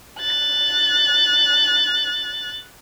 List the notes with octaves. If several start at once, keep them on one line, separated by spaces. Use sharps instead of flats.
F#6 A6